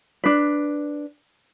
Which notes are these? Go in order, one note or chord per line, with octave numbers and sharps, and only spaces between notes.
D4 B4